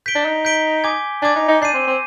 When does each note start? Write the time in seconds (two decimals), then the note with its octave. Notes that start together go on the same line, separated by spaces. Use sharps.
0.06 G6 B6 D7 G7
0.15 D4
0.25 D#4
0.45 G6 B6 D7 G7
0.84 G#5 D6 G#6
1.22 D4 G#5 D6 G#6
1.36 D#4
1.48 D#4
1.61 D4 G6 C7 D#7
1.74 C4
1.87 C4